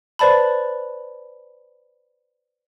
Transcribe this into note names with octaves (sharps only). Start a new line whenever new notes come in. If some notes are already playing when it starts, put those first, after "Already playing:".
B4 C5 D5 A5 B5